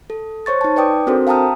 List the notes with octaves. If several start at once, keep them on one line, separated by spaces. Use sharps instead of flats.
A4
C5 C#5 C#6 A6
D#4 A5
B4 D5 G5 D6 D#6
C4 D4 F#4 A4 A#4 C5
F5 G5 A5 A#5 D#6 F6